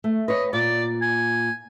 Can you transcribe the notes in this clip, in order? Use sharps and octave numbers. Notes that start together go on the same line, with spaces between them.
A3
B4 C#5 D#5
A#2 D5
G#5